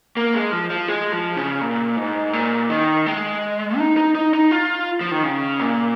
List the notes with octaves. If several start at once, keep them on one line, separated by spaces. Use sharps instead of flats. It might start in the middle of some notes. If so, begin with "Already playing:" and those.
A#3
G#3
F3
F3
G#3
F3
C#3
A#2
G#2
A#2
D#3
G#3
D#4
D#4
D#4
D#4
F4
F3
D#3
C#3
A#2